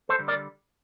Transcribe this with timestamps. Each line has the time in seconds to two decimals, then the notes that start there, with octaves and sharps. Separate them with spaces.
0.09 A4 C5
0.19 D3 G3
0.28 A#4 D5